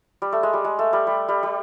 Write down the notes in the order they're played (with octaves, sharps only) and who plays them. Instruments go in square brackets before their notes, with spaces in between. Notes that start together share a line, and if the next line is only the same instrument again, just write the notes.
[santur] G3
A3
G#3
G3
G#3
A3
G3
G3
G3
G3